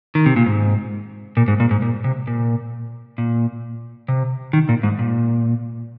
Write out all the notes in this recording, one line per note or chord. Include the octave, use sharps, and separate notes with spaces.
D#3
C3
A#2
G#2
A#2
G#2
A#2
G#2
A#2
C3
A#2
A#2
C3
D#3
A#2
G#2
A#2